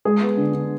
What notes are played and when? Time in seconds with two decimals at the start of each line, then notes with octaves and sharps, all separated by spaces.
0.05 G#3 G#4
0.21 B3
0.37 D3
0.54 D3